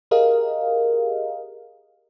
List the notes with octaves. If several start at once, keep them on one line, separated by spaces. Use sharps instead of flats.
G4 G#4 A#4 D#5 F5